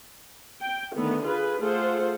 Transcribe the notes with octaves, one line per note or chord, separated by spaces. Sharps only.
G5
D3 D#3 A3 B3
F4 G#4 B4
A3 F4 G#4 A4 C5 F#5